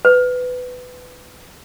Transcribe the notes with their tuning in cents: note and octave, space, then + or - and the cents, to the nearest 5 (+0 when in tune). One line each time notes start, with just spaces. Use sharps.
B4 +15